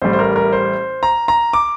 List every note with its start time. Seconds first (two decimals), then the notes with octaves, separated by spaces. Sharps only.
0.02 A1 A2 G3 C5
0.13 C5
0.19 A#4
0.36 A#4
0.53 C5
1.03 A#5
1.28 A#5
1.53 D6